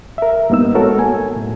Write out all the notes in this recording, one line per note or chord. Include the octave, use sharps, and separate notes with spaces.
A#4 E5
G2 A#3 B3 D#4 E6
G#3 B3 F#4 A4 A#4 C#5
G#5
A2